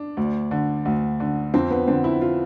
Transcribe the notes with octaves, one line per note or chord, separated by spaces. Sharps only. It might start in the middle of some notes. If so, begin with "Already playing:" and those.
Already playing: D4
D2
D3
D2
D3
F2 C4
B3
D3 C4
E4
F4